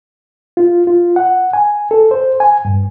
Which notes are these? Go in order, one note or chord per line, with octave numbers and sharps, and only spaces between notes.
F4
F4
F#5
G#5
A4
C5
G#5
G2